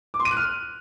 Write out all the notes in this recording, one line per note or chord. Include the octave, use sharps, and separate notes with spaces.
D6
C6
D#7
F#6
F6